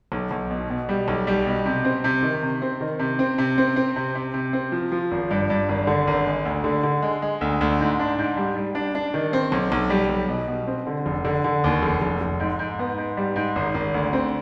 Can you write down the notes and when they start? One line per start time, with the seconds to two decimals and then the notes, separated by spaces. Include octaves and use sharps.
0.12 B1
0.31 B1
0.51 B2
0.70 B2
0.89 G3
1.08 B1
1.27 G3
1.46 B2
1.66 C3
1.85 C4
2.04 C3
2.23 D#3
2.42 C3
2.62 C4
2.81 D#3
2.99 C3
3.19 C4
3.38 C3
3.58 C4
3.76 C4
3.96 C3
4.15 C3
4.34 C3
4.53 C4
4.72 F3
4.92 F3
5.11 G#1
5.31 G2
5.50 G2
5.69 G#1
5.87 D3
6.07 G#1
6.26 G#3
6.45 D2
6.64 D3
6.83 D3
7.02 G#3
7.22 G#3
7.41 D2
7.61 D2
7.80 G#2
7.99 D4
8.19 G#2
8.37 G3
8.56 G3
8.75 D4
8.95 D4
9.14 D#3
9.33 C4
9.52 B1
9.72 B1
9.90 G3
10.09 B1
10.29 B2
10.48 B2
10.67 C4
10.87 D3
11.06 F1
11.25 D3
11.44 D3
11.64 D#2
11.82 F1
12.02 F1
12.21 F1
12.40 G#2
12.59 G#2
12.79 B3
12.98 G#2
13.17 G3
13.36 G#2
13.56 G#1
13.74 G#1
13.94 D2
14.13 C4